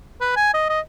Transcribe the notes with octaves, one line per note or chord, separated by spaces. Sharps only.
B4
G#5
D#5
D#5